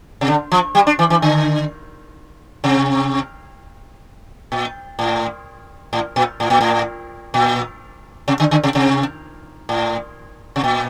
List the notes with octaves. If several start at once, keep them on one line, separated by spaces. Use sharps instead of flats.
C3
D3
F3
G3
D4
E3
E3
D3
C3
A#2
A2
A2
A#2
A2
A#2
A2
A#2
C3
D3
D3
C3
C3
A2
C3
A#2